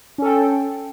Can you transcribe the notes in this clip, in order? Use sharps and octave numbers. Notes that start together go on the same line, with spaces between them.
C#4 A4 G5